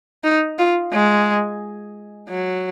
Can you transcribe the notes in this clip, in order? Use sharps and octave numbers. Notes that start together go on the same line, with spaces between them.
D#4
F4
G#3
F#3